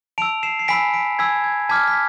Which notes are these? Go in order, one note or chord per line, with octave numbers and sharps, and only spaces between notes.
A5 E6 D7 F7
C7 E7
C7
G#5 B5 E6 B6 D7
B6 D7
G#5 B5 E6 G#6 B6
G#6
A5 D6 F6 G#6 B6
B6